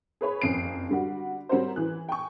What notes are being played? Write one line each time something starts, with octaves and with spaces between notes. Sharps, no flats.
G#4 B4 C#5 B5
F#1 F2 C#3 C7 D7
D3 G3 F#4
G3 C4 C#4 F#4 A#4 C5
E3 F#6
G5 G#5 C#6